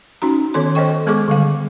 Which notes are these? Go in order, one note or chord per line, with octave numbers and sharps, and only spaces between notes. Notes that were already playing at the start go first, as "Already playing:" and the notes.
C#4 D#4 F#4 A#5
D#3 B3 A4 C#5 C6
A4 C5 C#5 D#5 G5 C#6
G#3 B3 G#4 A4 C#6 D6
D3 G3 F5